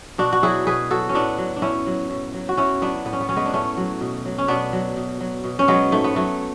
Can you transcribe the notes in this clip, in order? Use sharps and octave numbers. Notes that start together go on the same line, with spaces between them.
B2 D4 F#4
F#4
F#3 E4 G#4
B2 G#4 B4
F#3 F#4 A4
C#4
A2 B3 D4
F#3
D4
A2 C#4 E4
F#3
A2
F#3
F#4
A2 C#4 E4
F#3 B3 D4
A2 B3
C#4
B3
F#3 C#4
G#3 B3
D4
A2 A3 C#4
F#3
B2
F#3
C#4
B2 B3 D4
F#3
B2
F#3
B2
C#4
F#3 G#3 B3
G#2 A3
B3
F#3 A3